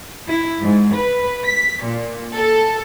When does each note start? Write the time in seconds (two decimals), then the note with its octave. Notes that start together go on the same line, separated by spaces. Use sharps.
0.28 E4
0.61 G#2
0.95 B4
1.45 B6
1.84 A#2
2.36 A4